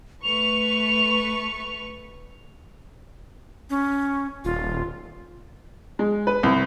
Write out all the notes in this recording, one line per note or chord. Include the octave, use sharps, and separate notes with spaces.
A3 B4 C#6 F7
C#4
D#1 F4
G#3
B4
C2